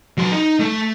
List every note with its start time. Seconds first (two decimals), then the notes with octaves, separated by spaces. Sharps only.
0.18 F#3 C6
0.32 D#4
0.60 A3